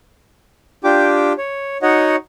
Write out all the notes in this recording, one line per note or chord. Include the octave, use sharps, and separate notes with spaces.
D4 F4 G4 G5 D6
C#5
D#4 F#4 C#5 D#5 F#5